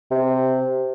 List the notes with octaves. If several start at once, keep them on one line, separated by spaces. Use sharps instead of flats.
C3